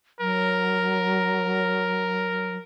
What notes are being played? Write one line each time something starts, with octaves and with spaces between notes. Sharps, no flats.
F#3 A#4